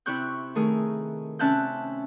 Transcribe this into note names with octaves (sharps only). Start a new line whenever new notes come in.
C3 E4 G4 C#6 F#6 G6
D#3 A3 G#4 A#4
C3 C#4 E5 A5 F#6 G6